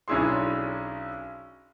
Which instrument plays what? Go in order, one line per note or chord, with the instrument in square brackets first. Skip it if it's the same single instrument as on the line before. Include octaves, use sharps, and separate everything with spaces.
[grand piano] B1 C#4 D4 E4 G#4 C6